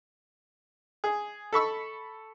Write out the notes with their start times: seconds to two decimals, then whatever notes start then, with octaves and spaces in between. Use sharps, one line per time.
1.04 G#4
1.53 A4 B5 C#6 E6